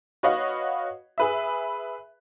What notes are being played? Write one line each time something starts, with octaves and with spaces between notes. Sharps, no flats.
F#4 B4 C#5 D#5 F5 F#5
G#4 B4 E5